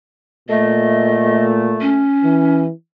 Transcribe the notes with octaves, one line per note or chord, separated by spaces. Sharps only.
A#2 A3 D#5
C#4
E3